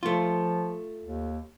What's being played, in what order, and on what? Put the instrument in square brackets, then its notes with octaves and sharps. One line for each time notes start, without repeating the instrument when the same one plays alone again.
[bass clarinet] F3 [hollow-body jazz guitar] A3 F4
[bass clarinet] D#2